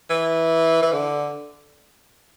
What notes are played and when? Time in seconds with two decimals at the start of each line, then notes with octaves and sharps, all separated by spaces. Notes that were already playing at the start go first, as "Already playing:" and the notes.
0.10 E3
0.82 E3
0.93 D3